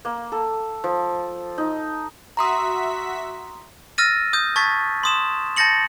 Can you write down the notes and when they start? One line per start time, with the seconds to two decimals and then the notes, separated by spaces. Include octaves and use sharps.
0.05 A#3
0.32 A4
0.84 F3
1.58 D#4
2.37 F#4 E5 A#5 C6 D#6 B6
3.98 E6 F6 A6 A#6 D#7
4.33 D#6 G6
4.56 A5 C#6 G#6 A6 B6
5.03 C6 D#6 E7
5.56 A5 G6 A6 A#6 C#7 F#7